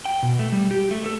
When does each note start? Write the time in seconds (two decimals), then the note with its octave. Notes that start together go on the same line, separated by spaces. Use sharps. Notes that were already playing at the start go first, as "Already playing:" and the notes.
0.05 G5
0.23 B2
0.39 A3
0.52 G3
0.71 G4
0.91 A3
1.06 A4